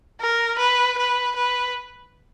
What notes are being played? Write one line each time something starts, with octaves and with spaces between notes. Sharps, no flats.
A#4
B4
B4
B4